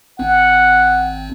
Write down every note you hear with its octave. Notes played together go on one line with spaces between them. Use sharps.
G#1 C4 F#5